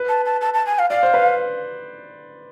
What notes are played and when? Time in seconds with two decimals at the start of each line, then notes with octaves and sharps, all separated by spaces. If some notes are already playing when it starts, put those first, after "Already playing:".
Already playing: B4
0.09 A5
0.25 A5
0.41 A5
0.54 A5
0.67 G#5
0.79 F5
0.90 D5 F5
1.03 C5
1.14 B4